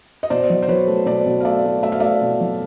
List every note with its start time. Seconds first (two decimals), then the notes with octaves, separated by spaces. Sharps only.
0.23 D#5
0.30 B2 C5 D5
0.50 F#3
0.62 C5
0.68 F#3 B4 C#5
0.88 A3
1.06 B2 C5 D5
1.26 B2
1.40 F5
1.45 A3 D5 E5
1.64 A3
1.83 A3 E5
1.92 F5
2.00 A3 D5 E5
2.21 B2
2.40 F#3